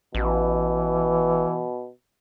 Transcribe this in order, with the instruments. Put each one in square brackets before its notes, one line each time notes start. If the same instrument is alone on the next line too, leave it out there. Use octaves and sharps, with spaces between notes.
[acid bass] A1 [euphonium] B2 [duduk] E3